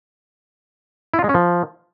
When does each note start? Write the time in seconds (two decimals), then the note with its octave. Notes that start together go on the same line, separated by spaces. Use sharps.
1.14 E4
1.19 F4
1.24 G#3
1.29 C#4
1.34 F3